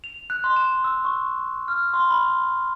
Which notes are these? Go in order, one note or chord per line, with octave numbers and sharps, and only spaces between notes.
F7
F#6
C6
E7
E6
C#6
F6
C6
B5